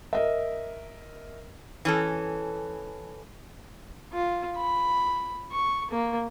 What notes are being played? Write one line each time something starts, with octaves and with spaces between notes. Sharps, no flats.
A#4 D#5 E5
E3 C#4 A4
F4
B5
C#6
A#3